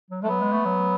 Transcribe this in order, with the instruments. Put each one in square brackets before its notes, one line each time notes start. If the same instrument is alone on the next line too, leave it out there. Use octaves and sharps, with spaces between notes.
[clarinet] F#3
[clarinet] G#3 [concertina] A3
[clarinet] F#3 [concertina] B3
[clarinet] G#3
A3
F#3